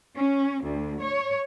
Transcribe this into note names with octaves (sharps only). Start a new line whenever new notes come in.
C#4
D2
C#5